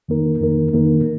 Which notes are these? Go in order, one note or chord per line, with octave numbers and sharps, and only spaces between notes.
F2 D#3 A#3 D#4 A#4
F2 D#3 A#3 D#4 A#4
F2 D#3 A#3 D#4 A#4